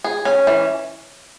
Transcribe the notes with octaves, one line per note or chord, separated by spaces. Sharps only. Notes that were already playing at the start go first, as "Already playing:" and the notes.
G#4
C#4
E3